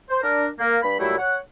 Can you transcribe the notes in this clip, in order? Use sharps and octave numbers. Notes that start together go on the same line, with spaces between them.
C5
D4 A#4
A#3
G2 B5
A#2 F#3 G3 A3 E4
C#5 F#5